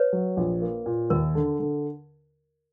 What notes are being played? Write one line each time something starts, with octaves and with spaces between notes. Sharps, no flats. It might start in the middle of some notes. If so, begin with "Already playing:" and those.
Already playing: B4 C#5
F#3
A#1
A#3
A#2
D#2 A#4
D3
D3